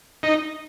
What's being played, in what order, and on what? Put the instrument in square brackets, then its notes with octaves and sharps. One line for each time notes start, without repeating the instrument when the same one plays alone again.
[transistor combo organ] D#4